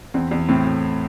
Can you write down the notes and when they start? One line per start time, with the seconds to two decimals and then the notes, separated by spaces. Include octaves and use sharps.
0.14 E2 C4
0.31 E2
0.49 A2 C4
0.66 A2